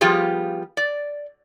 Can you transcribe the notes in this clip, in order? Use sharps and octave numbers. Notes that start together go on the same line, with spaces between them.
F3 G3 B3 F4 G4 G#4
D5